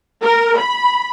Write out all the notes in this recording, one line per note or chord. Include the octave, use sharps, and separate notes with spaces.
A#4
B5